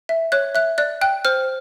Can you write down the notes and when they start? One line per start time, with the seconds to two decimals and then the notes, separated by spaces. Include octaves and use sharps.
0.09 E5
0.32 C#5 F#6
0.55 E5 F#6
0.78 D5 F#6
1.01 G5 F#6
1.25 C5 F6